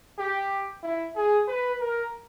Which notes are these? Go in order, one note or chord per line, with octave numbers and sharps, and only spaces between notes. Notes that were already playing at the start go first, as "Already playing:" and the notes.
G4
E4
G#4
B4
A#4